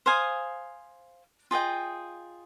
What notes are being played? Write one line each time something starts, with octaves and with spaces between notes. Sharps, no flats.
C5 F5 G#5 D#6
F4 G#4 D#5 G5